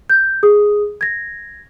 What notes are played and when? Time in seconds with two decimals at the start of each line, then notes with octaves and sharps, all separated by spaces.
0.10 G6
0.43 G#4 D#6
1.01 G#6 A#6